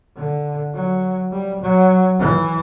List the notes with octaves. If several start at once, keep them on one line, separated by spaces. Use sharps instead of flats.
D3
F#3
G3
F#3
E3